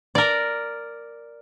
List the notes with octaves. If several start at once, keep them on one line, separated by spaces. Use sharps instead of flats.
A#4 D5